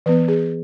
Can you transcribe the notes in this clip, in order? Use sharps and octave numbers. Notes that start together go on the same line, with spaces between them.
E3 B3 B4
G#4